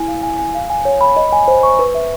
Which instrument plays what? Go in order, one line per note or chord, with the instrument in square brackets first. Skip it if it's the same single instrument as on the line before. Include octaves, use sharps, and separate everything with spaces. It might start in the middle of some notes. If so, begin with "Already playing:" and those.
Already playing: [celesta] E4 G#5
F5
G#5
G#5
F5
G#5
C#5
B5
D#5
G#5
C5
C#6
B4
E5